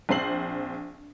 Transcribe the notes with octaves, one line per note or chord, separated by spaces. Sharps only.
A#1 C4 C5 C7 F#7